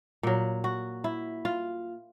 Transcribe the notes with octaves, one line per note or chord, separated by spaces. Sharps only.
A#2 F#3
F#4
E4
F4